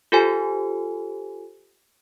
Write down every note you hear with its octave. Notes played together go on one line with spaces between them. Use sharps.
F4 G4 A4 C5 G#5